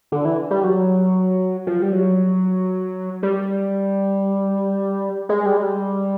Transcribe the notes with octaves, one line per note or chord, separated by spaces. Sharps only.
D3
E3
G3
F#3
F3
G3
F#3
G3
G#3
G3
G#3
G3